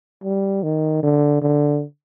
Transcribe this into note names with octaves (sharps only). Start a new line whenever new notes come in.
G3
D#3
D3
D3